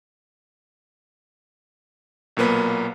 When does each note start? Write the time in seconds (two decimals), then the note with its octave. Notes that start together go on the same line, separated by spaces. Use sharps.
2.37 B1 A#2 A#3 B3 B4